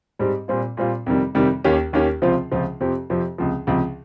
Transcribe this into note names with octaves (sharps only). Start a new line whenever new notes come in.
G#2 G3 C4 G4
A#2 G3 C4 F4
A#2 G3 C4 F4
F2 C3 D#3 G3
F2 C3 D#3 G3
D#2 D#3 A#3 C#4 G4
D#2 D#3 A#3 C#4 G4
C#2 C3 F3 C4 F4
C#2 C3 F3 C4 F4
F2 C3 F3 C4 G4
F2 C3 F3 C4 G4
C#2 C3 F3
C#2 C3 F3